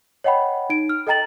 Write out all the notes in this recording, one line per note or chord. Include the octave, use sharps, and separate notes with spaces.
C#5 D#5 F#5 G5 B5
D#4 D7
F6
A4 D#5 G5 A#5 A6 F#7